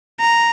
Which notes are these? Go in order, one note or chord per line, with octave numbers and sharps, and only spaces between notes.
A#5